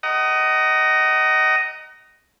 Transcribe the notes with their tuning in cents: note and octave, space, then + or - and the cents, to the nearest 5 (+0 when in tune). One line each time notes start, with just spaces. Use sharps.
D#5 +0 F#5 +35 A#5 +0